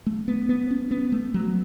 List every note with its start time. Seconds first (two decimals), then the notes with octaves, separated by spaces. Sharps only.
0.06 A3
0.28 B3
0.49 B3
0.71 C#4
0.91 B3
1.12 A3
1.34 F#3